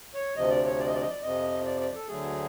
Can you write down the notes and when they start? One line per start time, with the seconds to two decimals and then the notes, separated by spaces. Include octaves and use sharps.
0.15 C#5
0.36 D2 C3 F3 D#5
0.50 D5
0.65 C#5
0.79 D5
0.87 D#5
0.94 D5
1.02 D#5
1.09 D5
1.22 F2 C3 F3 D#5
1.66 D5
1.80 D5
1.95 A4
2.08 D2 D3 F#3 A3 G#4